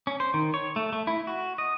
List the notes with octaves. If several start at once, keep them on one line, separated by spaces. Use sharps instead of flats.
C#4
C5
D#3
C#5
A3
A3
E4
F#4
D#5